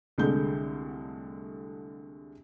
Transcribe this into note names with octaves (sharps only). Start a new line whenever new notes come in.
C2 D3 G#3 A3 G6